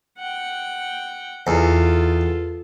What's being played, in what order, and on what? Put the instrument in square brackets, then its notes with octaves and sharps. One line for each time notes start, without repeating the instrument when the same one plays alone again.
[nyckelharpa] F#5 G5
[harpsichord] E2 [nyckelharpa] F4 A4